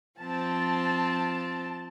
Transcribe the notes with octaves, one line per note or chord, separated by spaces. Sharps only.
F3 C4 A5